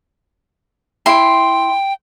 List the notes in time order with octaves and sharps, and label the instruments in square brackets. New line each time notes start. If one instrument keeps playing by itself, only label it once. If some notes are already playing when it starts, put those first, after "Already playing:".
[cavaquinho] E4 C6 [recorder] G5